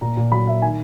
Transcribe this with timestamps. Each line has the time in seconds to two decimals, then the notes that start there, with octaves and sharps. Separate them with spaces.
0.01 A#2 A#5
0.17 A#2
0.32 F#3 B5
0.47 A#3 E5
0.62 D#3 G#5